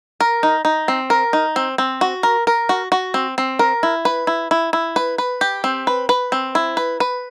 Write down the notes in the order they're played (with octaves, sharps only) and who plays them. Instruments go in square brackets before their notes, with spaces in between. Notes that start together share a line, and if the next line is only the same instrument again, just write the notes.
[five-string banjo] A#4
D#4
D#4
C4
A#4
D#4
C4
C4
F#4
A#4
A#4
F#4
F#4
C4
C4
A#4
E4
B4
E4
E4
E4
B4
B4
G4
C4
B4
B4
C4
E4
B4
B4